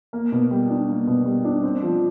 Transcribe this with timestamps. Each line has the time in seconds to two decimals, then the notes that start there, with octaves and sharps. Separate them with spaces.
0.13 A#3
0.32 B2
0.51 G3
0.70 D4
0.89 A#3
1.07 B2
1.26 G3
1.45 D4
1.63 C4
1.82 F3